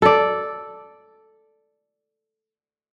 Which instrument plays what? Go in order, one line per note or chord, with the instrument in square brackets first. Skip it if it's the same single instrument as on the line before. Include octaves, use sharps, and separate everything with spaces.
[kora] A4 D5